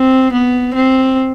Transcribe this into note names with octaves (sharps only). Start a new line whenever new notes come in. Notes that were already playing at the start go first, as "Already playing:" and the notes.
Already playing: C4
B3
C4